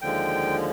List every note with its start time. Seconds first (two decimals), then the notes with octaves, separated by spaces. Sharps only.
0.01 D#2 D3 F3 G#3 G5